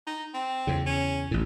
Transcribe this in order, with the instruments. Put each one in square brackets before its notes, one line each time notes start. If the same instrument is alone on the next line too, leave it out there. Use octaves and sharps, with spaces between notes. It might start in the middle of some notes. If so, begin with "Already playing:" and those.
[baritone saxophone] D#4
C4
[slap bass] E2 C#3
[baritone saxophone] C#4
[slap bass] A1 A2